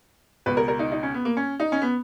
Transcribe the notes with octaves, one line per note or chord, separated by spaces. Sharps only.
C#2 B2 B4
A#4
A#4
D#4
D#4
C#4
B3
A#3
C#4
D#4
C#4
B3